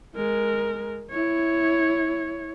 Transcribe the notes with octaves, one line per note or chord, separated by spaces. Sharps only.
G#3 A#4
E4 C#5